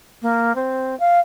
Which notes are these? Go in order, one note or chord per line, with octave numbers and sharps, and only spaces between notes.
A#3
C4
F5